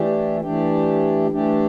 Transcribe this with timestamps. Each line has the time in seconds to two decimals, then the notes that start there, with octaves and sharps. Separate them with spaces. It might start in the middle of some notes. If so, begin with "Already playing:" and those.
Already playing: E3 A3 D4 G4
0.41 E3 A3 D4 G4
1.31 E3 A3 D4 G4